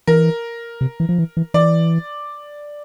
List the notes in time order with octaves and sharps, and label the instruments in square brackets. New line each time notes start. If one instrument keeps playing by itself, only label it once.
[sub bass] E3 [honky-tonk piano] A#4
[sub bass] C3
E3
F3
E3
E3
[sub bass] E3 [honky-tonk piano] D5